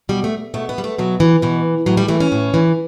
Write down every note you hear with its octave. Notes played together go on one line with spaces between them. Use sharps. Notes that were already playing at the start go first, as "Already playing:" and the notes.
B2 G3
A3
B2 A3
B3
G3
A3
B2 F#3
E3
B2 E3
A2 F#3
G3
E3 A3
C#4
A2
E3